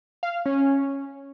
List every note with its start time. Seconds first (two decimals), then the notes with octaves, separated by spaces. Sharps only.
0.23 F5
0.46 C#4